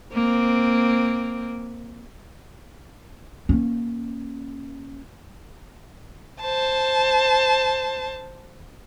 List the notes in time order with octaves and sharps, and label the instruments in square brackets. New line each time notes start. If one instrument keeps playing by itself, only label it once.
[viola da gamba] A#3 C4
[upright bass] A#3 C#4
[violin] C5 A5